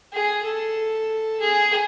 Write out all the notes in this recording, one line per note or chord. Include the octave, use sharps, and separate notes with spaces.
G#4
A4
G#4